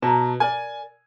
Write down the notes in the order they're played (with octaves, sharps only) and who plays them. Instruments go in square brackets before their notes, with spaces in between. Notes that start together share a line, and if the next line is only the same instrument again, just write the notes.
[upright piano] B2 [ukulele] A5 A#5
[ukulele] A#4 D5 [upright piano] G#5